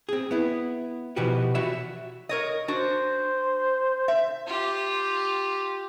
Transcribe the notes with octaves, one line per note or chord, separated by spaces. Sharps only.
C4 G#4
B3 E4
B2 E3 F3 F#4 G4 B4
F#4 C#5 E5 B5
A#4 C#5 D#5
D4 F#4 C5
E5
F4 G4